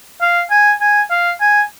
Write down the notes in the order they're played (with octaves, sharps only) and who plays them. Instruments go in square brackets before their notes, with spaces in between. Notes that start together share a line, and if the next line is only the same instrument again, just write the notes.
[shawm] F5
G#5
G#5
F5
G#5